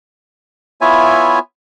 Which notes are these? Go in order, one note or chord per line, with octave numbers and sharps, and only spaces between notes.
B3 E4 F4 C#5 E5 G#5